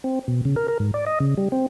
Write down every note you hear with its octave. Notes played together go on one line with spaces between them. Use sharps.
C4
B2
C#3
A#4
A#4
G#2
D5
D#5
C#3
G3
C4